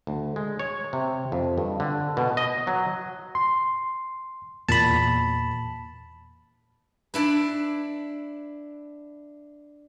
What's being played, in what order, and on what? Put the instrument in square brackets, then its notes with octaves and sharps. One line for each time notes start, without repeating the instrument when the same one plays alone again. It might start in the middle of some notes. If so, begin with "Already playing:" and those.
[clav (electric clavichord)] D2
G#3
C#5
C3
F2
G2
D3
B2
D#5
F#3
[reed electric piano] C6
[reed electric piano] E2 A#2 [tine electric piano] A5 B5
[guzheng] D4 E4 B4